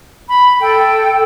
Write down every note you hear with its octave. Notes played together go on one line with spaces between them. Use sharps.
B5
A4 G5